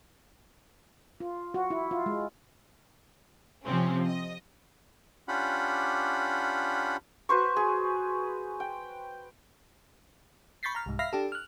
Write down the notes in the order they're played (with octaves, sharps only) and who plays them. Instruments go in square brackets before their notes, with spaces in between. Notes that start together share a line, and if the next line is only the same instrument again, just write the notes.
[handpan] F4
F#4
E4
F4
G#3
[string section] C3 F3 C4 C#4
D#5
[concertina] C#4 D4 F4 G4 F#5 B5
[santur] F#4 B4 C5 C#6
G#4
G5
[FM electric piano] B5 C#6 G6 A6 B6 C7
A#5 F6
C2 G#2
E5 F5 B5 F6 A#6 C7
D4 G4 A4
F6 F#6